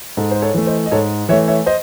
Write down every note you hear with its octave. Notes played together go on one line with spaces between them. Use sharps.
G#2 A4
C5
A4 C#5
E3 A3
C5 D#5
D#5
G#2 A4 C#5
E3 A3 C#5 E5
C#5 E5
C5 D#5